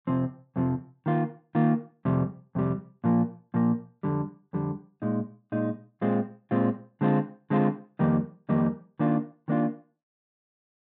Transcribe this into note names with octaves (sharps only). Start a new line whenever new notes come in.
F2 C3 F3 C4
F2 C3 F3 C4
D#3 A#3 F4
D#3 A#3 F4
F2 C3 G3
F2 C3 G3
A#2 F3 A#3
A#2 F3 A#3
F2 D3 G3
F2 D3 G3
A#2 G#3 D#4
A#2 G#3 D#4
A#2 G#3 C4 F4
A#2 G#3 C4 F4
D3 G#3 C4 F4
D3 G#3 C4 F4
F2 D#3 G3 A#3 D#4
F2 D#3 G3 A#3 D#4
D#3 A#3 D4 F4
D#3 A#3 D4 F4